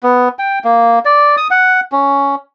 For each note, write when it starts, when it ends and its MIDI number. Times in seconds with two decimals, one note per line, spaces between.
0.03 0.29 59
0.39 0.59 79
0.64 0.99 58
1.05 1.36 74
1.37 1.48 87
1.51 1.80 78
1.92 2.35 61